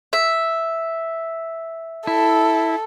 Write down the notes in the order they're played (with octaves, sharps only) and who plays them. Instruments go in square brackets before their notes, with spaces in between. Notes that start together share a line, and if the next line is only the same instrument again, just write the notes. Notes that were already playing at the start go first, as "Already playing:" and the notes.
[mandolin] E5
[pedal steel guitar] E4 [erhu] A4